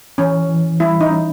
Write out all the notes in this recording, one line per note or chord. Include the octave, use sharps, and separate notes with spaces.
E3 C#4
E3
G3 E4
D#4
C#4